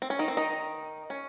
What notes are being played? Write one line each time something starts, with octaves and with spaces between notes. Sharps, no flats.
C4
C#4
D#3 D#4
C4
D#3 D#4
C#4